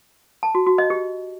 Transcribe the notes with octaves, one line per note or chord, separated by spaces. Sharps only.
A5
F#4
F#4
D#5
G4